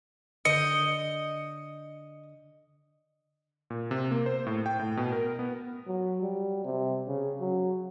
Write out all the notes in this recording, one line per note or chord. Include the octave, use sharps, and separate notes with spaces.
D3 D#5 G6 C#7
A#2
C3
A#3
C5
A2
G5
A2
B2
A#4
B3
F#3
G3
C3
C#3
F#3